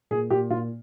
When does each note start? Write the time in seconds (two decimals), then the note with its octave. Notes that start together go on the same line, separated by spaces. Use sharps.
0.11 A#2 G#4
0.30 A#2 G4
0.50 A#2 F4